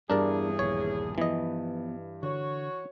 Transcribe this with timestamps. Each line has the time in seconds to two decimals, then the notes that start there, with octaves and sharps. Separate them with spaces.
0.10 E2 G2 D4 G#4 A#4 D5
0.59 A#1 D#2 C#5
1.18 E3 F3 B3 D#5
2.23 D3 F#4 C#5